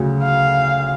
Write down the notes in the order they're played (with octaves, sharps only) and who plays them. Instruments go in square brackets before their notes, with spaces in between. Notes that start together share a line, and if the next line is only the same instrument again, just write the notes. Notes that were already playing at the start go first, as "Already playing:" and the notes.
Already playing: [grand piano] D2 C#3 F#3
[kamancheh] F5